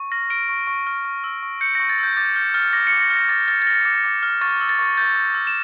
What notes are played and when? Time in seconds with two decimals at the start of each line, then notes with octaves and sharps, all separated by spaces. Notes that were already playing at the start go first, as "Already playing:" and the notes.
Already playing: C#6
0.12 F6 A#6
0.30 F6 D7
0.49 C#6
0.67 C#6
0.87 F6
1.05 C#6
1.24 E6
1.43 C#6
1.61 G6 C#7
1.75 C#6 A#6
1.90 A6
1.98 E6 G6
2.17 D6 A6
2.36 F6 G6
2.54 F6 A6
2.73 D6 A#6
2.87 C#7
2.92 D6
3.01 A#6
3.10 F6
3.16 A#6
3.29 D6 A6
3.48 F6 A6
3.62 A6
3.67 F6 A#6
3.85 D6
4.04 D6
4.23 F6
4.41 C#6 A6
4.61 E6
4.69 A6
4.79 C#6
4.97 G6 A6
5.16 C#6
5.34 E6
5.47 E7